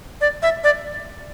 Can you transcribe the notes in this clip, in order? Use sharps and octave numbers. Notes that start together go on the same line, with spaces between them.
D5
E5
D5